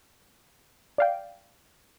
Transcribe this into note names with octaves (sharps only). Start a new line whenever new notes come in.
D5 F5 G5